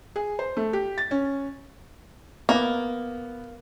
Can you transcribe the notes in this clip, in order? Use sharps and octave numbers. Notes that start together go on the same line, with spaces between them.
G#4
C5
A3
G4
A6
C#4
A#3 B3